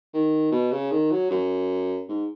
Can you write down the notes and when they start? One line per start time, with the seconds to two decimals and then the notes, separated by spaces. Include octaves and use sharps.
0.14 D#3
0.52 B2
0.72 C#3
0.92 D#3
1.12 F#3
1.30 F#2
2.09 G#2